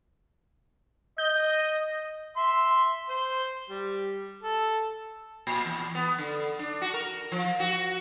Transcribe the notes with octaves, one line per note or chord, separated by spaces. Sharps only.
D#5 G6
E5 C6
C5
G3
A4
A#2
E2
B3
D3
D4
F#4
A#4
F3
F#4